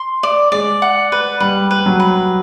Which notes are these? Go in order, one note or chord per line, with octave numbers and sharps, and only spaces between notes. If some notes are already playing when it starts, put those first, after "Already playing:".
Already playing: C6
D5
G#3 D5
F#5
B4
G3 B4
B4
F#3
B4